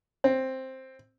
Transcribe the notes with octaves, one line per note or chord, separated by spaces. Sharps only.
C4